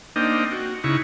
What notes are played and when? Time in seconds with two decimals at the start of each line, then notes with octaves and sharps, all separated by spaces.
0.16 A#3 C4 D4 D#4 D#5 G5
0.52 F#4
0.84 C#3 D#4 E4 C#6